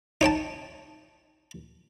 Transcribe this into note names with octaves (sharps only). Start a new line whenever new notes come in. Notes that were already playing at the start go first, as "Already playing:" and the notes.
D#4 C#5 G5 A5